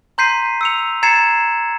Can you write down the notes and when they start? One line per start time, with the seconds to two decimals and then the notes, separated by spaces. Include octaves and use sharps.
0.18 A#5 C6 G6 B6 C7 D#7
0.61 E6 C#7 F7
1.03 A#5 G#6 A6 C7 C#7 E7